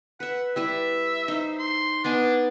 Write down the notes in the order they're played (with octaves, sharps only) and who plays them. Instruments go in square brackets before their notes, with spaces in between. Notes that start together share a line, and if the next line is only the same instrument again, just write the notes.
[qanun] B4 E5 [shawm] F#5
[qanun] G3 E4 B4 [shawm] E5
[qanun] D#4 C5
[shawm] C6
[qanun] B3 D#4 G#5 [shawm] D4